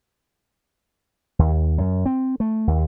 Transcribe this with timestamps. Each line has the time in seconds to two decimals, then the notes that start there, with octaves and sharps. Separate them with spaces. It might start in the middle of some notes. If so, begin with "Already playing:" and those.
1.39 D#2
1.78 F#2
2.06 C4
2.40 A3
2.67 D#2